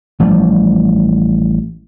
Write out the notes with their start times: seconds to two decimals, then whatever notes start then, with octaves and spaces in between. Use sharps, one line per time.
0.20 A1 F3 G3